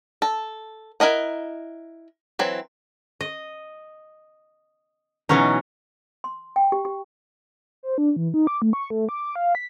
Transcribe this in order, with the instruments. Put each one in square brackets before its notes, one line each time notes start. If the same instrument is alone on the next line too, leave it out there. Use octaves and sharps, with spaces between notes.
[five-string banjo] A4
E4 A#4 D#5 F#5
E3 F#3 C4
[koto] D#5
B2 E3 F#3 C#4 D#4
[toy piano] C6
G5
G4
G4
[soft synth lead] C5
D4
E3
D#4
D6
A3
C#6
A3
D6
F5
B6